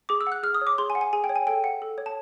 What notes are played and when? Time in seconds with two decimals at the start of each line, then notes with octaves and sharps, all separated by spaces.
0.09 G#4 D6
0.21 E6
0.27 F#5
0.32 F#6
0.43 G#4 F6
0.55 D#6
0.61 C#5
0.67 D6
0.78 G#4 C6
0.90 G#5
0.95 F#5
1.01 G#5
1.13 G#4 G#5
1.24 G5
1.29 C#5
1.36 G#5
1.47 A4 G5
1.64 F#5
1.82 A4
1.98 C#5
2.06 A5